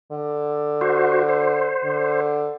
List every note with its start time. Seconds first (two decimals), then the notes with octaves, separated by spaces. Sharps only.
0.12 D3
0.81 F#4 C5
1.29 C5
1.84 D3